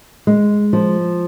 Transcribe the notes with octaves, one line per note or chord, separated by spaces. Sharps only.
G#3
F3